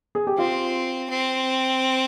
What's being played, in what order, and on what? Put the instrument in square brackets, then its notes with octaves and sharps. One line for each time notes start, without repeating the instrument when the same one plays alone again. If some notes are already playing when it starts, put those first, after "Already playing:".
[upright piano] G#4
G4
[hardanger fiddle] C4 [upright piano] F4
[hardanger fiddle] C4